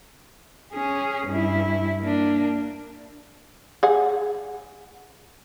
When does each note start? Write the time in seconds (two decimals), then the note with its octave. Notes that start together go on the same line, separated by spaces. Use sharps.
0.73 C#4 G#4
1.28 G2 E4
2.01 A#3 D4
3.83 G#4 F#5